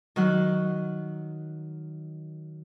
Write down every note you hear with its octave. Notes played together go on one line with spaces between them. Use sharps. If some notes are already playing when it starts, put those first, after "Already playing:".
D#3 F#3 F#6